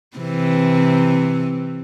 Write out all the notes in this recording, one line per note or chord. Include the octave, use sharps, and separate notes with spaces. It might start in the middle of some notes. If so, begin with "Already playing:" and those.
C3 E3 C4